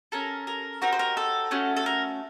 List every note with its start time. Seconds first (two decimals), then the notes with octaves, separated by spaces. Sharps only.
0.12 C#4 A4 A#4
0.47 A#4
0.82 C4 D#4 F#4 A#4
0.92 C5
0.99 A#4
1.17 A4
1.51 A3 C#4 F#4
1.77 A4
1.86 A#4